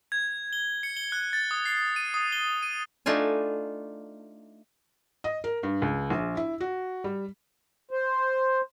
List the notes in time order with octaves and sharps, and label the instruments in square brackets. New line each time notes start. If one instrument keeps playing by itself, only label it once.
[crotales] G#6
G7
C#7
G7
F#6
A6
D#6
C7
D#7
D#6
G7
D#7
[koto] A3 D4 D#4 F4 G#5
[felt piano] D#5
A#4
G2
C#2
A#1
E4
F#4
G3
[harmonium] C5